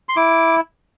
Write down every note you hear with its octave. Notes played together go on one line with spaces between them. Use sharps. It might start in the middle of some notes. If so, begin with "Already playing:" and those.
C6
E4 D6